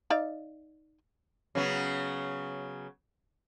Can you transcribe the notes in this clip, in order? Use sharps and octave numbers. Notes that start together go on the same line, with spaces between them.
D#4 D5 F5
C#3 F#3 B3